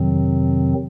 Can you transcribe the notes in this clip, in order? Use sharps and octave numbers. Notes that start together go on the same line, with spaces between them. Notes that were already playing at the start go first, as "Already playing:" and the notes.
Already playing: F2 C3 D#3 F#3 C4